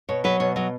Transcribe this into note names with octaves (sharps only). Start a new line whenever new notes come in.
B2 C#5
F#3 B4
B2 C#5
F#3 D#5